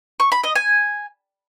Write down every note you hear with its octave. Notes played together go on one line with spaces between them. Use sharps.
C#6
B5
D#5
G#5